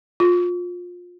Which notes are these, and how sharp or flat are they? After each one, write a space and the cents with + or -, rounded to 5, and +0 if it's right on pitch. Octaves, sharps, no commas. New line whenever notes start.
F4 +25